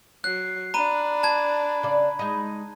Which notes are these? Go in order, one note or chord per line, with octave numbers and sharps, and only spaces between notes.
F#3 F#6 C7
D4 A#5 B5 D#7
A5 G#6
C#3 D5
G#3 D#4